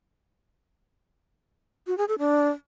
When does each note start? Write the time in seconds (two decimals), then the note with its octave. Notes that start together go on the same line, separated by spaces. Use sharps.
1.87 F#4
1.98 G#4
2.08 A4
2.19 D4